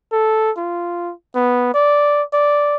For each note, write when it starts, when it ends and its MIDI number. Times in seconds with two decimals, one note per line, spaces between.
0.12 0.51 69
0.57 1.13 65
1.35 1.72 59
1.74 2.23 74
2.33 2.77 74